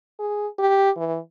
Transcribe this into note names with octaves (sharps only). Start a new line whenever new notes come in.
G#4
G4
E3